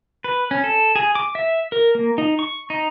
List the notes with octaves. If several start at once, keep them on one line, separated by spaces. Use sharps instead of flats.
B4
C#4
A4
G#4
D6
E5
A#4
A#3
D#4
C#6
D#4